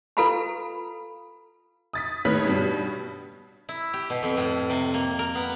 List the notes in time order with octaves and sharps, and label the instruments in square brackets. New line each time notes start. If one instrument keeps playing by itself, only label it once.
[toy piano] F4 A4 B4 F5 A#5 B5
[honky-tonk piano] D#6 A6 B6
A2 D#3 B4 C#5 B6
G2 B2 G3
[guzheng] E4
G4
B2
F2
A2
C3
A#3
A#4
B3